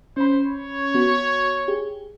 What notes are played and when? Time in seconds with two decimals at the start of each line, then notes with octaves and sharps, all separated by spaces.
0.17 C#4 C5 B5
0.46 C#5
0.94 B3 F#4
1.68 G4 G#4